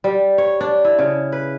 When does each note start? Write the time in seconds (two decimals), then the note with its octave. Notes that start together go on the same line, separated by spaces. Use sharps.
0.04 G3
0.38 C#5
0.61 D4
0.85 E4
0.99 C#3
1.32 B4